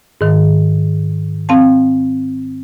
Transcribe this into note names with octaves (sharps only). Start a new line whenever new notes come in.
G#2 D#3
C4 F5 A5